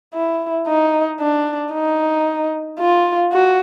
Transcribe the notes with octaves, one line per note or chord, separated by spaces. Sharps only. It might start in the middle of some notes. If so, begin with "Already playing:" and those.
E4
D#4
D4
D#4
F4
F#4